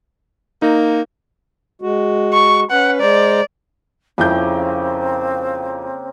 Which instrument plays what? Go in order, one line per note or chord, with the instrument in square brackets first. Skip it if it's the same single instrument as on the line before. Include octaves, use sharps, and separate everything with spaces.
[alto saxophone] A#3 [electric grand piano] D#4
[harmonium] G#3 F#4
[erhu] C#6
[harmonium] C#4 B4 [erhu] F#5
[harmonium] G#3 C5 A#5 [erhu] D5
[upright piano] F2 E4 G6 [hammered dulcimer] C#3 A#3 G5 [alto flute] C4